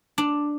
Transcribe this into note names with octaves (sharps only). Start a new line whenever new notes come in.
D4